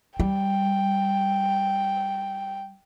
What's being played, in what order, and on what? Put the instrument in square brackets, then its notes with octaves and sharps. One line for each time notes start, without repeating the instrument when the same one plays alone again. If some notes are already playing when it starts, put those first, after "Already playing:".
[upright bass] G3 [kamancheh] G5